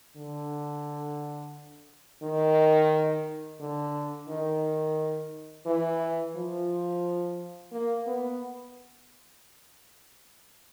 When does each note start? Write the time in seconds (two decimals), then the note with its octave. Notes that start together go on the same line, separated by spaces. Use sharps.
0.17 D3
2.23 D#3
3.60 D3
4.29 D#3
5.66 E3
6.36 F3
7.72 A#3
8.07 B3